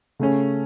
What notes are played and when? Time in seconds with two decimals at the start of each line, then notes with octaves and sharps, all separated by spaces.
0.19 C#3 A3 C#4